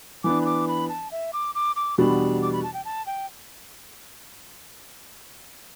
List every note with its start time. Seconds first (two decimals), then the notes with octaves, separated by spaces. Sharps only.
0.24 E3 B3 D4 D6
0.41 B5
0.45 D6
0.68 B5
0.89 A5
1.11 E5
1.33 D6
1.55 D6
1.76 D6
1.98 E2 B2 G3 D4 B5
2.42 D6
2.53 B5
2.63 A5
2.74 G5
2.85 A5
3.06 G5